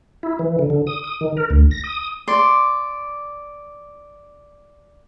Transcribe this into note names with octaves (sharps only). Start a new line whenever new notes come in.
E4
E3
D3
D3
D#6
D#6
D#3
A#4
D2
A#6
D#6
D5 C6